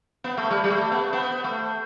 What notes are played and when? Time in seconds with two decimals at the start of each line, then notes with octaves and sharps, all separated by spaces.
0.24 B3
0.38 A3
0.50 G3
0.64 G3
0.70 A3
0.92 B3
1.13 B3
1.44 A3